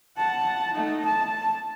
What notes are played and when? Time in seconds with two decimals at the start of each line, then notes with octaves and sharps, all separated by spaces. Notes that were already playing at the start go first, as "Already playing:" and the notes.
0.17 F#5 A5
0.73 A3 D#4
1.05 A5